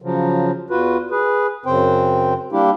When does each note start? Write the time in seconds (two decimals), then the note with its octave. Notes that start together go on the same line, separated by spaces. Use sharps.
0.02 C#3 F3 F#3
0.70 E2 F4 F#4 B4
1.11 G#4 B4
1.66 F#2 C#3 C4 C5 G5
2.52 G3 A#3 D4 E4 G4